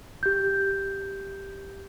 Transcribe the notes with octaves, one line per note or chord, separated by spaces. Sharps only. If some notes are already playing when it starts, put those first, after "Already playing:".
G4 G6